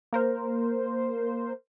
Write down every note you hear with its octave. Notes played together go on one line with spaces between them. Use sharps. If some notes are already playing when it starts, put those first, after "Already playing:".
A#3 A#4 C5